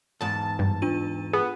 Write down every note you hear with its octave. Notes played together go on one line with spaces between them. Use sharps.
E2 G#2 A5
G2
D4 F4 D#7
B3 G#4